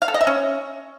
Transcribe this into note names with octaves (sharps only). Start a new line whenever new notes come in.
F5
A4
D#5
E5
C#4